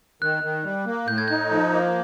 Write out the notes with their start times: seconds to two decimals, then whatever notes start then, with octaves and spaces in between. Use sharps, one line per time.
0.22 D#3 F#6
0.43 D#3
0.64 G3
0.86 A#3
1.08 A2 G6
1.18 G#6
1.28 D#4 G6
1.51 F3
1.72 A#3